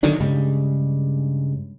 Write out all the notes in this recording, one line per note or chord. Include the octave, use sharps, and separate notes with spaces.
D3 D#3 F#3 D4
G2 C#3 G3 G#3